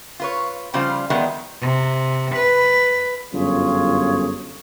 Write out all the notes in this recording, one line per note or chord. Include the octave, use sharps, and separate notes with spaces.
F4 B4 C#5
C#3 F3 G3 F4 C5
D#3 F3 G3 G#3 B3 E4
C3
B4
G1 F#2 F4 G#4 C#5